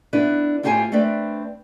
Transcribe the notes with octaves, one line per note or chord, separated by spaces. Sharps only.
B3 D4 E4 B4
A2 F4 G4 C5 F5 G#5
A3 C4 D4 B4 D5